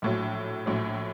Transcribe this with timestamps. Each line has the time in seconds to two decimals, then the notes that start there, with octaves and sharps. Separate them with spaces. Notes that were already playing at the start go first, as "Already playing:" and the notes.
0.02 A#1 A2 F#3
0.66 A#1 A2 F#3